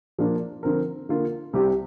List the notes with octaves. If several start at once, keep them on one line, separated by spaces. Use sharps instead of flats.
A#2 F3 A#3 D4
D3 F3 C4 A#4
D3 A#3 F4 A#4
C2 C3 G3 C4 G4